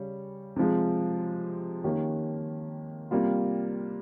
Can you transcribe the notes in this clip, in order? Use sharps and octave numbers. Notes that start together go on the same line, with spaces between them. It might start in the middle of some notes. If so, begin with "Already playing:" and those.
Already playing: C#3 G3 C#4
C3 F3 G#3
D#3 A#3 C#4 G4
C3 G3 A#3 F4